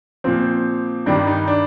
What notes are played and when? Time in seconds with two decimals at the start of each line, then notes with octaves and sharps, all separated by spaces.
0.24 A#2 F3 C4
1.06 G2 D#3 G3 D4
1.27 D#4
1.47 D4